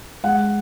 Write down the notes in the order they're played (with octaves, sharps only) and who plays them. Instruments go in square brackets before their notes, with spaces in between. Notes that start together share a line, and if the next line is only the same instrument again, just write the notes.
[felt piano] G#3 F#5